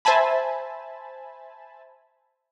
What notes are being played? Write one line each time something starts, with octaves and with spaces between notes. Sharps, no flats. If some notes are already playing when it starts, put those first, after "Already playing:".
C5 E5 G#5 A5 B5